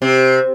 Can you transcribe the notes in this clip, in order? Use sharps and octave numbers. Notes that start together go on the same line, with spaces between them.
C3